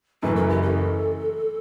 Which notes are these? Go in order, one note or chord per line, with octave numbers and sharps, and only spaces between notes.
F#1 F#2 E3 A3 E4 B4
A4
G4
A4